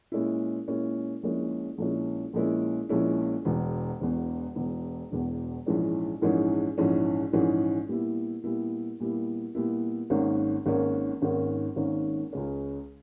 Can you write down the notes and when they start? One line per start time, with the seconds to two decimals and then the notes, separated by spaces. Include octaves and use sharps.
0.12 A#2 G#3 C#4 E4
0.68 A#2 G#3 C#4 E4
1.23 A#1 A#2 G#3 C#4 E4
1.78 A#1 A#2 G#3 C#4 E4
2.33 A#1 A#2 G#3 C#4 E4
2.89 A#1 A#2 G#3 C#4 E4
3.45 E1 E2 B2
4.00 E1 E2 B2
4.56 E1 E2 B2
5.11 E1 E2 B2
5.66 A#1 G#2 E3 G#3 C#4
6.21 A#1 G#2 E3 G#3 C#4
6.78 A#1 G#2 E3 G#3 C#4
7.33 A#1 G#2 E3 G#3 C#4
7.89 A#2 G3 B3 E4
8.44 A#2 G3 B3 E4
9.00 A#2 G3 B3 E4
9.55 A#2 G3 B3 E4
10.10 G#1 G#2 D#3 A#3 C#4
10.66 G#1 G#2 D#3 A#3 C#4
11.22 G#1 G#2 D#3 A#3 C#4
11.76 G#1 G#2 D#3 A#3 C#4
12.33 C#2 C#3 G#3 C#4